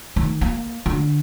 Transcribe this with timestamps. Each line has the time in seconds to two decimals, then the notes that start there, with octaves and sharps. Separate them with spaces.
0.16 D#3
0.41 A#3
0.86 D3